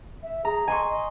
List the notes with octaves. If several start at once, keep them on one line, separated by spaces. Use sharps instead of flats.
E5
G#4 A#5
D#5 G#5 C6 C#6
D#5